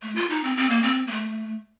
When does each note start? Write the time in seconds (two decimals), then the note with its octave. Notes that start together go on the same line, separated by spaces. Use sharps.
0.02 A3
0.15 F4
0.30 D#4
0.44 C4
0.57 C4
0.70 A#3
0.82 C4
1.07 A#3
1.11 A3